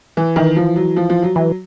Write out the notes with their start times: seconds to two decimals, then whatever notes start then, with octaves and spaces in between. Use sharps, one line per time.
0.17 E3
0.36 D#3 E3
0.56 F3
0.76 F#3
0.96 F3
1.10 F3
1.22 F#3
1.36 E3 F#3